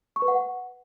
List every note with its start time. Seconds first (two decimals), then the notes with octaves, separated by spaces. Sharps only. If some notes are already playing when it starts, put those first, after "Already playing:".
0.16 C#6
0.22 B4
0.28 F#5